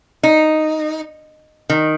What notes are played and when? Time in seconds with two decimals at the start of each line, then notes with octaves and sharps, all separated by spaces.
0.23 D#4
1.70 D#3